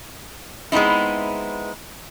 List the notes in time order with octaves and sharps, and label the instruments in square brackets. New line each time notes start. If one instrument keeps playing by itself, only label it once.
[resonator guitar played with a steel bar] G#3 B3 C4 D#4 E4